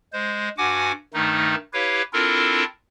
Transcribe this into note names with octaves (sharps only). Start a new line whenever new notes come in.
G#3 C5
G2 F#4 F#5 G#5 D6
G2 D#3 A3 D#4
E4 G4 B4 C#5 F5
C4 D4 E4 F4 A4 A#4